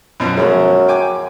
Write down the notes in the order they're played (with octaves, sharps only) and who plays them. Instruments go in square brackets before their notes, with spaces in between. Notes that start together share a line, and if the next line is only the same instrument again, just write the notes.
[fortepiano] F#2 B2 F3
[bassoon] F#2 [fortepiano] F3 G#3
[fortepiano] G5 G#5 D6